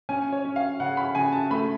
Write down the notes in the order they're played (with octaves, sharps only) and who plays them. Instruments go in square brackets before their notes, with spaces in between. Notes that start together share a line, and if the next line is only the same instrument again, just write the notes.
[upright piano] C#4 G#5
C#5
C#4
F5
C#3 F#5
B5
C#3 G#5
A5
A3 B5